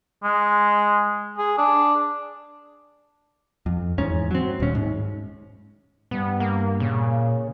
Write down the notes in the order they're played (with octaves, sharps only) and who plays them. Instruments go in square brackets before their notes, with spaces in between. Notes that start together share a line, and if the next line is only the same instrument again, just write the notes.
[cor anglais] G#3
G#4
D4
[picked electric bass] F2
E2 G#2 C#4
F#3 C4
D#1 C#4
G#2
[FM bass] G2 [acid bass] B3
[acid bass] A#3
[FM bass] A#2 [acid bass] C#3